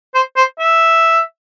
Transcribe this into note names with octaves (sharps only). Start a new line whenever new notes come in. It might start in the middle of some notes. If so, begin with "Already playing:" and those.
C5
C5
E5